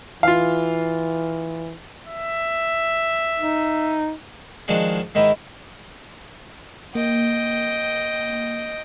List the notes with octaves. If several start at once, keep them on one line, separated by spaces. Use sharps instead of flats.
E3 F4 F5
E5
D#4
D#3 F3 G#3 D4 F#4 G#4
G#2 D#3 D#4 E4
A#3 D#5 G5